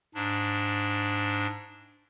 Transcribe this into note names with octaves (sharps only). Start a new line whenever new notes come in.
G#2 D4